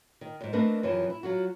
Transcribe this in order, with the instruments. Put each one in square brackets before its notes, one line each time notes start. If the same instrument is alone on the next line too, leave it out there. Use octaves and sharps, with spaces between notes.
[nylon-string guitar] D#3
E2 G#2
A3 A#3 C4 D4 B4 D#5
F#2 C3 E3 F3
E4
F#3 F4 F#4